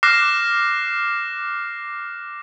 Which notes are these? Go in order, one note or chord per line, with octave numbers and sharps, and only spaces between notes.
D6 F6 F#6 A#6 C7 E7